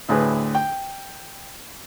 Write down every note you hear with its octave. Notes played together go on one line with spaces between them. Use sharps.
D2 A2 G#4 B4
G5